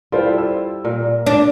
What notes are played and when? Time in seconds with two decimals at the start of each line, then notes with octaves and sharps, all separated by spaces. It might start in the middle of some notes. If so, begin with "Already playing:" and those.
0.12 G3 E4 F4 A4 C5
0.38 E6
0.84 A#2 A#4
1.26 D4